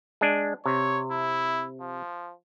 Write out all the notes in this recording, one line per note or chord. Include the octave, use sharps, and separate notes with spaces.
G#3 D4
C3 C#5
E4
F3